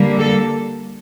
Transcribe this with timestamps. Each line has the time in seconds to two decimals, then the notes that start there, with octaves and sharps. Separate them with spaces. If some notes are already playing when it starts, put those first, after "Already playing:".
Already playing: D3 G3 A#3
0.18 A4